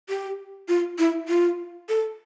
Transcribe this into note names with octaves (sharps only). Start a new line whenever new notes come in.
G4
F4
E4
F4
A4